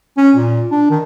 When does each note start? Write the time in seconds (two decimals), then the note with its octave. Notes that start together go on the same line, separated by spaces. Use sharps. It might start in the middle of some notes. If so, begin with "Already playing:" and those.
0.17 C#4
0.36 A#2
0.71 D4
0.90 D#3